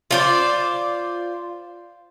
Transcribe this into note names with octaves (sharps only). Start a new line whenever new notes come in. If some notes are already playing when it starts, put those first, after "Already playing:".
F4 C5 D5